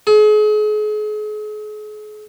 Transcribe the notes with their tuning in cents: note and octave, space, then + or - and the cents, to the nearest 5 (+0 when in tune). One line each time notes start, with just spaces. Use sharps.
G#4 +40